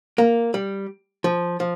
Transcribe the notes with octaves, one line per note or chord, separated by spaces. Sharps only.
A#3
G3
F3
F3